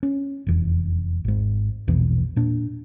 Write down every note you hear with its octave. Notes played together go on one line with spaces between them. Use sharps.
C#4
F1 E2
G#1 G#2
A#1 E2 B2
A#2 D4